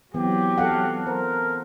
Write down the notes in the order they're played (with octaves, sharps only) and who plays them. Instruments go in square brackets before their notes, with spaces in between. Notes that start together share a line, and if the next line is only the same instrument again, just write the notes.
[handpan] E3 B3 C4 [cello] F#3 [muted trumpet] G4
[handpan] A4 F5 F#5
[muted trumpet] A#4 [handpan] C5